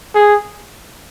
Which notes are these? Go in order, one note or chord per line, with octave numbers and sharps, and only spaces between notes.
G#4